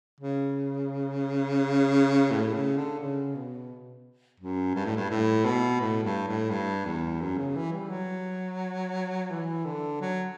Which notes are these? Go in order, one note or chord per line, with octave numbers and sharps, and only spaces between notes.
C#3
A2
C#3
D3
C#3
B2
F#2
G2
A2
G2
A2
B2
A2
G2
A2
G2
E2
F#2
C#3
E3
G3
F#3
E3
D3
F#3